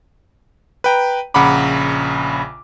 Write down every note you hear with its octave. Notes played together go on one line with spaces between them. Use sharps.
B4 G5 A#5
A#1 C#3 F#5 A#5 B5 D6